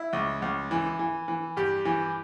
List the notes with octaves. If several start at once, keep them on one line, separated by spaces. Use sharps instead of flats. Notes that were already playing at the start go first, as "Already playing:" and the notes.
Already playing: E4
C#2
C#2
E3
E3
E3
G2 G4
E3